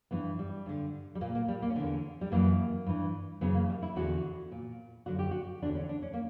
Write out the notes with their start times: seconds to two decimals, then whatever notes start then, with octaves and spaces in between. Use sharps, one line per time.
0.11 G2 E3 B3
0.39 G3
0.66 G2 D3
1.15 G3
1.21 A#2 A#3
1.35 A#3
1.48 G3
1.62 A#3
1.70 C#4
1.76 E2 D3 B3
2.21 G3
2.32 F#2 E3 A#3
2.86 G2 E3
3.41 F#2 C#3 E3 B3
3.55 A#3
3.70 G3
3.83 E4
3.96 E2 D3 F#4
4.52 A#2
5.06 F#2 D3 F#4
5.19 G4
5.31 F#4
5.62 E2 D4
5.66 D3
5.75 C#4
5.89 D4
6.02 C#4
6.13 A#3